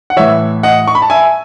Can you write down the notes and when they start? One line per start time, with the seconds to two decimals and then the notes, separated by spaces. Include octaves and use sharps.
0.10 F#5
0.16 A2 E3 C#5 E5
0.63 D#5 F#5
0.87 C#6
0.95 B5
1.02 A5
1.10 E5 G#5